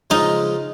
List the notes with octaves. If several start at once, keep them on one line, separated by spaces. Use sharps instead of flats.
C#3 F3 G#3 C#4 D#4 F4